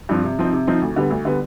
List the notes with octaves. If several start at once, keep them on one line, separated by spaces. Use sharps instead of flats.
G2 F3 C4
C3
F3 C4 D#4
C3
F3 C4 D#4
D2
D3 G3 B3
D2
D3 G3 B3